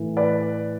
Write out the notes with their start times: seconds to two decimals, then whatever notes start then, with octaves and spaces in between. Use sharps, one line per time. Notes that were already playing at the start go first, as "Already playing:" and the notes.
Already playing: A2 E3
0.17 B4 D5